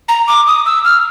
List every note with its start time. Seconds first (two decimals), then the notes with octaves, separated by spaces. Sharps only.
0.09 A#5
0.28 D6
0.47 D#6
0.66 E6
0.85 F6